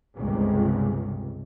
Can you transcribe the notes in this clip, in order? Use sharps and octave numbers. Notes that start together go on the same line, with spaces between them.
G1 C#2 G2 C3